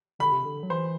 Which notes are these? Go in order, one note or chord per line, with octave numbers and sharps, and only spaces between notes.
D3 B5
C3
D3
F#3
E3 C5